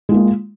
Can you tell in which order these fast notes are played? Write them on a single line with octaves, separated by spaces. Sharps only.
G#3 F4 A#3